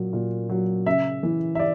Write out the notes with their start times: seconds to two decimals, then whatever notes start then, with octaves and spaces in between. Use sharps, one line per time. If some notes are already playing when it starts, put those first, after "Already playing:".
Already playing: A#2 F#3
0.13 A#2
0.49 F#3
0.86 C#3 E5
1.23 E3
1.55 E5
1.59 D5